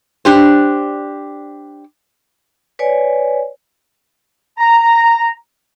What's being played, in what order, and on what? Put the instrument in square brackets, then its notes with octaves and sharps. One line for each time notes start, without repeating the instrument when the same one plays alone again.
[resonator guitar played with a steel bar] D4 G4 C5
[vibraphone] B4 C#5 D5 G#5
[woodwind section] A#5